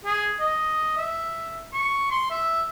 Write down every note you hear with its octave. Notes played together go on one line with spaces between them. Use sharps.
G#4
D#5
E5
C#6
C6
E5